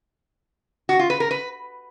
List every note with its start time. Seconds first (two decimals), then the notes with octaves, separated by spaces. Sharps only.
0.89 F#4
0.99 F4
1.10 B4
1.20 A#4
1.31 B4